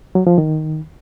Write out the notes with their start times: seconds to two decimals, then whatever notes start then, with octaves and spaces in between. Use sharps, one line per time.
0.15 F#3
0.27 F3
0.38 D#3